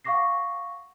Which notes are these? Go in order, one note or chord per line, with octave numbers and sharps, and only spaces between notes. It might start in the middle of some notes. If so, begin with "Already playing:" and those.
F5 F#5 C#6 D6 A#6 C7